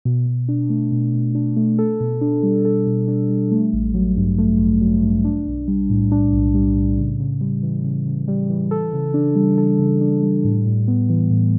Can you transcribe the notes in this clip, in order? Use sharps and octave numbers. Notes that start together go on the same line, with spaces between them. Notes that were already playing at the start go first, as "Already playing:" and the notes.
B2
B2
D4
A3
B2
B2
D4
A3
A4
B2
D4
G3
A4
B2
D4
G3
A3
A1
F#3
G2
A3
A1
F#3
G2
D4
B1
G3
A2
D4
B1
G3
A2
C#3
C#3
G3
E3
C#3
C#3
G3
E3
A4
C#3
D4
G3
A4
C#3
D4
G3
A2
A2
B3
E3
A2